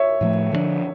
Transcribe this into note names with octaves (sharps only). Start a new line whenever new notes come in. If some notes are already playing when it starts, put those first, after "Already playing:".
Already playing: C#5 E5
A2 F3 A3
D3 F3 A3 D4